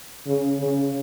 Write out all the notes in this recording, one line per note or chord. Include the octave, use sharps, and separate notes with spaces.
C#3
C#3